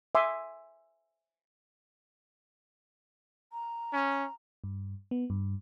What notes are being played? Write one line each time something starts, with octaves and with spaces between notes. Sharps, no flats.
E5 G#5 C6 D6 D#6
A#5
C#4
G2
B3
G2